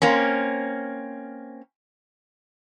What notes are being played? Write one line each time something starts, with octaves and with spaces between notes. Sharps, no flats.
A#3 C4 C#4